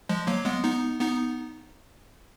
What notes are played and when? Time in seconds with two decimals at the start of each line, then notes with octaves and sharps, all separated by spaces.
0.09 F3 G#3
0.27 F#3 A#3
0.45 G#3 B3
0.64 B3 D#4
1.01 B3 D#4